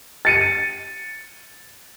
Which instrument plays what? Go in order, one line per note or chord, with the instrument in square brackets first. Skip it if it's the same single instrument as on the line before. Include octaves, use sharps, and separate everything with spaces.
[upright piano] A6 C#7 D#7